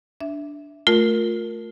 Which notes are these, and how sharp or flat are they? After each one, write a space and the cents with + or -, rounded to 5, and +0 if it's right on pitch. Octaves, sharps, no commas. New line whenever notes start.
D4 -5 E5 -5
A3 +0 F4 +25 A#4 +0